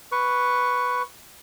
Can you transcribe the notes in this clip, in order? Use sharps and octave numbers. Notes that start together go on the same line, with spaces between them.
B4 C#6